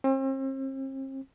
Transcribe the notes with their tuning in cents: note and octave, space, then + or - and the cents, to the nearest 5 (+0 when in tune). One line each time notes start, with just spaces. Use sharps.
C4 +40